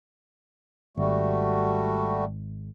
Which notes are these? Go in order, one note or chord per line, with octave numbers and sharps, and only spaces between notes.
G#1 G3 A3 F#4